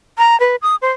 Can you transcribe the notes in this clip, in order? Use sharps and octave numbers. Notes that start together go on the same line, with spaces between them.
A#5
B4
D#6
C5